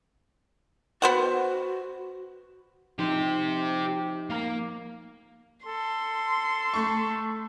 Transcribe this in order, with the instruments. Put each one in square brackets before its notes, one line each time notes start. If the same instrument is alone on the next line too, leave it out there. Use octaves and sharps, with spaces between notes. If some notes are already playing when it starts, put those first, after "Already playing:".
[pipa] B3 C5 F#5 [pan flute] F#4
[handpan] F3 D#4 [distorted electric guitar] G4 C5
[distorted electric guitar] A#3 A#5
[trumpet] A4 [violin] C6
[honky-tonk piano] A3 C#6